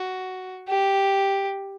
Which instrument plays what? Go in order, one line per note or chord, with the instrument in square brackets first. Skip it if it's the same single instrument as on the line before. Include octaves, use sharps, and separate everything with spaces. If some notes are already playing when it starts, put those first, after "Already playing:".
Already playing: [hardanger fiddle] F#4
G4